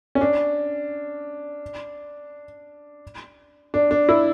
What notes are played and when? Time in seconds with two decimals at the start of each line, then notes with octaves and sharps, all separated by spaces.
0.15 C#4
0.21 D4
3.74 D4
3.91 D4
4.09 E4